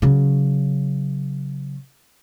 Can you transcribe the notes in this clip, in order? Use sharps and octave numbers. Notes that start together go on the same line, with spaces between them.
C#3 F#3